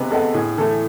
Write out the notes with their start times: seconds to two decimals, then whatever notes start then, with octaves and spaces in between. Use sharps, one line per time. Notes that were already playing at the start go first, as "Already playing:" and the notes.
Already playing: C3 G#3 B3 B4
0.11 G#3 B3 A4
0.34 A2 G#4
0.58 E3 A3 A4